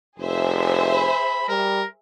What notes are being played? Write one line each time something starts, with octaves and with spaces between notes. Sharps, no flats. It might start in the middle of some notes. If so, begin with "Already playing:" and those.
F1 G#4 C5 E5
B5
G3 A#4